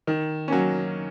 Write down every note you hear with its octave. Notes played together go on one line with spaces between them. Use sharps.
D#3
F#3 A#3 C#4